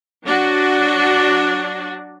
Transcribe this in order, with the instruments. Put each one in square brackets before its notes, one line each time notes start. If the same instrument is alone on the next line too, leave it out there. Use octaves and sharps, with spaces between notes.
[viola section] F#3 D4 F#4